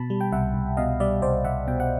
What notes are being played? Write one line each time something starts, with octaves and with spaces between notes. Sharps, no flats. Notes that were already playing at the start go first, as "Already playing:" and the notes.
Already playing: B2 A5 B5
G3
G5
C2 E5 F#5
C2
B2 D#5 F5
G3 D5 E5
C2 C5 D5
C2 E5 F#5
B2 G5
F#5